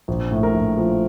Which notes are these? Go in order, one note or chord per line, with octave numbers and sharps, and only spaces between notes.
A#1
A2
A#4
A#1
F3